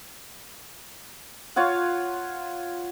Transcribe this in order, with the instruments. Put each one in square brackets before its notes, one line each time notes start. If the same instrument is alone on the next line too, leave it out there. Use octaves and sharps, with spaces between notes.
[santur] F4 C#5 F5 F#5